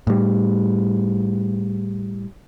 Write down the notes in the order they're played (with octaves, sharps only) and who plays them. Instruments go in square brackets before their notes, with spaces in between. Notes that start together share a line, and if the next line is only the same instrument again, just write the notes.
[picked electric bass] A2 G3